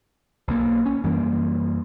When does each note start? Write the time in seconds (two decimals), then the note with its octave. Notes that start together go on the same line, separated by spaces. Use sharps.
0.48 B1 A#3
0.86 C#4
1.04 F#2 E3 G3 A#3